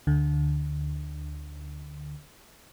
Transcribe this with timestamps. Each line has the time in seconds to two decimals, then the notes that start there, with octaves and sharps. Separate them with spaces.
0.07 D2 D3